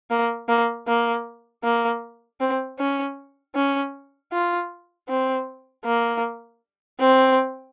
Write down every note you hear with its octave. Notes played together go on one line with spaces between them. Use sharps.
A#3
A#3
A#3
A#3
C4
C#4
C#4
F4
C4
A#3
C4